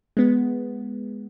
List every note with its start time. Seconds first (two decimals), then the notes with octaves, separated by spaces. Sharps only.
0.17 G#3 B3